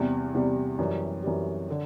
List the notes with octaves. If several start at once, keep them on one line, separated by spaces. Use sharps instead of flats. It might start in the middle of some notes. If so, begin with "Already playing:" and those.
Already playing: E2 C3 G3
E2 C3 G3
F#2 E3 G3
F#2 E3 G3
D3